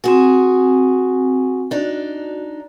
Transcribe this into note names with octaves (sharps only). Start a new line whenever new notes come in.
C4 F#4 G#4 G#5
D4 D#4 F#4